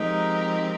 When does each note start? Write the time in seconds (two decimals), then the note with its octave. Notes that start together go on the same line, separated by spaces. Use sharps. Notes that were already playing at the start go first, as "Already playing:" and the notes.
Already playing: F3 G#3 C4 D#4 G4 A#4